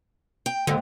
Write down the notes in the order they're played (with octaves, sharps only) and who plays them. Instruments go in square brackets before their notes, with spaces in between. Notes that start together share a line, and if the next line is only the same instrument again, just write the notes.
[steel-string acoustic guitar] G5
[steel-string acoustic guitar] D#2 G#2 [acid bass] D3